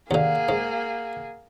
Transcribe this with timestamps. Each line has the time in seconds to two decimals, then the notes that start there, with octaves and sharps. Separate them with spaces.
0.11 D#2 D3 A#3 G#4 F5 F#5
0.49 G#2